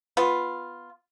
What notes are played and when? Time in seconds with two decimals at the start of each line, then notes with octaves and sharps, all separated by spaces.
0.17 B3 F4